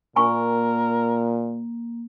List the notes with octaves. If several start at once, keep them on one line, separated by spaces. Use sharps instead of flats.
A#2 A#3 A#4 G#5 C#6